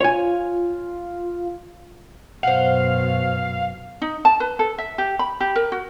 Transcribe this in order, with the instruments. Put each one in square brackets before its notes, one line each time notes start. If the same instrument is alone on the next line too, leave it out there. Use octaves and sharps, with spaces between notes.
[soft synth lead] F4 [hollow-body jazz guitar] C#5 G#5
[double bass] F#2 B2 [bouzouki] C5 F#5 [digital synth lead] F5
[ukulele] D#4
A5
B4
A4
E5
G4
B5
G4
A#4
F#4